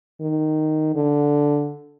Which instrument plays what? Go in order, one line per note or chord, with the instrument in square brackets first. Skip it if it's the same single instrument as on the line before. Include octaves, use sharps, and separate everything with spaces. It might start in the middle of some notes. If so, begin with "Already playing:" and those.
[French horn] D#3
D3